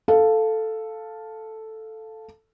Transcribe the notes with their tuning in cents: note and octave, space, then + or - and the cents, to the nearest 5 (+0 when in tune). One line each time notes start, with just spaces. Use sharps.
A4 +0 F5 +0